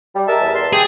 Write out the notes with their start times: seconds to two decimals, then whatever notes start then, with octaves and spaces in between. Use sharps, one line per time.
0.14 G3
0.27 G#3 G#4 A#4 E5 A5
0.41 E2
0.55 A5 C6
0.73 G4 G#4